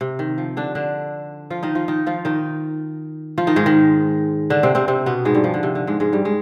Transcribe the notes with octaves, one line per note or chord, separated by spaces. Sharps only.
C3
D#3
F3
D3 D4
D3 D4
F3 F4
D#3 D#4
F3 F4
D#3 D#4
F3 F4
D#3 D#4
F3 F4
D#3 D#4
G#2 G#3
D#3
D3 D4
C3 C4
C3 C4
C3 C4
B2 B3
G#2 G#3
G2 G3
F3
D3
C3
D3
G#2 G#3
G#2 G#3
G2 G3
G#3